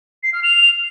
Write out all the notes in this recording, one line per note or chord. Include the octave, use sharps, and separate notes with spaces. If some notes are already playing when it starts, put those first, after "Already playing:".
C7
F6
F7